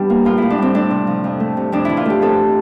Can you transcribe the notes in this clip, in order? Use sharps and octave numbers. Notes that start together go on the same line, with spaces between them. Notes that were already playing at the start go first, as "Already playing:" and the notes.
Already playing: E2 G3 D4 G4
A#3
A2 F4
A2 E4
D4
G3 C4
A3 D4
C3
F3
F2
A3
C3
F2 D4
E3 E4
F4
A3 G4
F2 A4